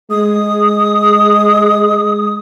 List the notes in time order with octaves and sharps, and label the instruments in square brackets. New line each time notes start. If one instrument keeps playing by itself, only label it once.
[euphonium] G#3 [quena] D#6